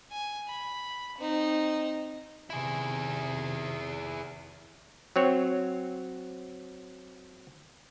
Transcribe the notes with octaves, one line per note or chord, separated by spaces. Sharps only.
G#5
B5
C4 D#4
C3 D#3 E4 G#4
F#3 C4 C#5